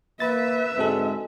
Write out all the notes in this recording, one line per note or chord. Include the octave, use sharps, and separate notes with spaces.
A#3 B4 E5 B5 A6
G#2 D3 G#3 C4 F#4 A4